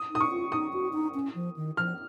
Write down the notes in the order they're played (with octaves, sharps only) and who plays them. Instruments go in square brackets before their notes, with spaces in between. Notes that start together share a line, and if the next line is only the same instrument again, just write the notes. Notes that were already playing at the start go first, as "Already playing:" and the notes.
Already playing: [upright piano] D#6
[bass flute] D#4 [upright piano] D#6
[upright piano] C#6
[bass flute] F4
[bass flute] D#4 [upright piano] D#6
[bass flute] F#4
D#4
C#4
F3
D#3
[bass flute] F3 [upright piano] F6